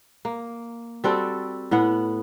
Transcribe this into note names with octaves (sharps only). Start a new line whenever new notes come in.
A#3
G3 C4 F#4 A4
A2 B3 F#5